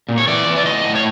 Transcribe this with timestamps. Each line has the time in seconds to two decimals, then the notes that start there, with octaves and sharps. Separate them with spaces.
0.09 A#2
0.18 C#5
0.27 E3 D5
0.46 E3
0.56 D5
0.66 A2 D#5
0.84 A2
0.95 C#5